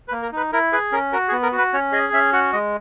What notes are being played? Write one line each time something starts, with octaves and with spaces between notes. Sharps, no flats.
B4
A#3
A#4
D#4 B4
E4 A#4
G#4 B4
C#4 A#4
F#4 A#4
G#4
B3
A#4
F#4
B4
C#4 C#5
G#4 D#5
C#4 E5
F#4 F#5
G#3 D#5